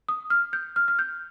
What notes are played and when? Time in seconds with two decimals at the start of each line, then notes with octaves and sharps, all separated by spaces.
0.09 D#6
0.30 F6
0.53 G6
0.76 F6
0.88 F6
0.99 G6